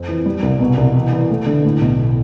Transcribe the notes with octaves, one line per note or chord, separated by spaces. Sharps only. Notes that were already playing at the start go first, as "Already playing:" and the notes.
Already playing: F2 C4
E3
G3
C2
B2
C2
E3
E3
A3
D3
A2
B1